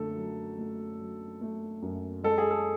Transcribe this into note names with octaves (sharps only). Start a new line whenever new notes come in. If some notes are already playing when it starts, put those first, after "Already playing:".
Already playing: F#2 D3 A3 A4
F#3
A3
F#3
A3
F#2
G#3 A4
G#4
A4